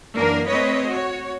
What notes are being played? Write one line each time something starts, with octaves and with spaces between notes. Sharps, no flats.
F#2 E3 A#3 D4 A#4
A3 C4 B4 C#5 D#5
F#4 C#5